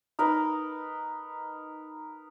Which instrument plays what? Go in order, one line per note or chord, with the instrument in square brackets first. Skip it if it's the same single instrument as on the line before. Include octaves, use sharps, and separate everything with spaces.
[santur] D#4 A#4 B4 D#5